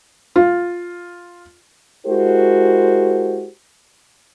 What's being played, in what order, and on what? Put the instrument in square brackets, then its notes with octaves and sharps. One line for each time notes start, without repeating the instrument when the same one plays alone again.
[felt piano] F4
[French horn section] G#3 E4 F#4 G4 A#4 C5